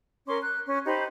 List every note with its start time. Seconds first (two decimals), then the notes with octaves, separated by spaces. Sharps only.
0.27 C#4 A#4 C6 D6
0.42 F#6
0.66 C#4
0.85 D#4 G4 C5 B5